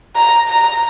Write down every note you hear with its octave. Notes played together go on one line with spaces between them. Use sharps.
A#5
A#5